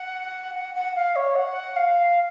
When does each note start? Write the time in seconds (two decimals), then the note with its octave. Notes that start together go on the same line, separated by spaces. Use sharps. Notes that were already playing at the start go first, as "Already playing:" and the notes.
Already playing: F#5
0.54 F#5
0.75 F#5
0.95 F5
1.16 C#5
1.35 F#5
1.76 F5